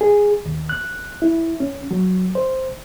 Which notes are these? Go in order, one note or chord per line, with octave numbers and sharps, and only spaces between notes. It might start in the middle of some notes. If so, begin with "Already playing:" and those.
G#4
D#2
F#6
E4
C#4
F#3
C5